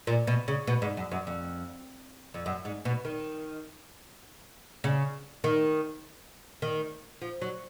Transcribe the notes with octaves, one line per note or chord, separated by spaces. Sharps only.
A#2
B2
C#3
B2
G#2
F#2
F#2
F2
F2
F#2
G#2
B2
D#3
C#3
D#3
D#3
F3
F#3